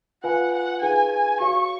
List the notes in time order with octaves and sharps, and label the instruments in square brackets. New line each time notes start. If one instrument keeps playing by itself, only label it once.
[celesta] F4 B4 F5 G#5 B5 [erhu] F#5
[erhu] F#5
[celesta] D#4 G#4 B4 F5 [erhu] G#5
[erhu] G#5
[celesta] F#4 C#5 F5 [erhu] C#6